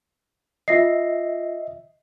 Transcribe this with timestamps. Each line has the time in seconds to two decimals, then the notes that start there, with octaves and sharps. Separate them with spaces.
0.68 F4 D#5 E5 A#6 C7